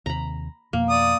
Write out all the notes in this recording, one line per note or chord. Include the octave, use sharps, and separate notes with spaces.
D#2 C3 A#5 B5
F2 B2 A#3
D5 D#6